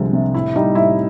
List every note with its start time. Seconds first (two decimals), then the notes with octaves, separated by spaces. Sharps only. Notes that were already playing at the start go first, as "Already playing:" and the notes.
Already playing: C2 D3 F3 G#3
0.13 C3
0.35 A2 E4
0.56 G3 D#4
0.75 A2 E4